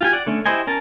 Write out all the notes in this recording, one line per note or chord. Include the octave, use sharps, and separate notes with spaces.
F4 G4 G#5
D5 F#5
D3 A3 C#4
E4 G4 C5 D#5 G#5
C#4 A#4 A5